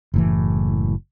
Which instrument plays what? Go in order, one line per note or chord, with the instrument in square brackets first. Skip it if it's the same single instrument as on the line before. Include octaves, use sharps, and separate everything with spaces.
[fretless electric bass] F#1 A2 E3